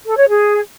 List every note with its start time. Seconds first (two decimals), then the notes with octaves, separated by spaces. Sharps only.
0.06 A4
0.17 C#5
0.28 G#4